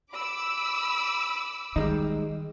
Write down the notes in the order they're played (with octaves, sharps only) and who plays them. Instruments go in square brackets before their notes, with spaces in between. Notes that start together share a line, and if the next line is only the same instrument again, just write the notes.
[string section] B5 D6 E6
[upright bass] D#3 [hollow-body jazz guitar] G3 G#3 D#4